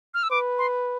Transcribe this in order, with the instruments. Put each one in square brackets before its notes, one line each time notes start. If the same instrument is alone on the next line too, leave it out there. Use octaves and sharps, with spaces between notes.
[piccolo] F6
E6
[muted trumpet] B4 [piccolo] D6
[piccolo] C6